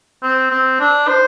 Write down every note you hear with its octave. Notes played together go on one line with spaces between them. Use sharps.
C4
C4
D4
C5